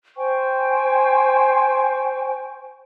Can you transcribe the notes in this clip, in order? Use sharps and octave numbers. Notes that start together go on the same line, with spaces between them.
C5 G5 G#5 C#6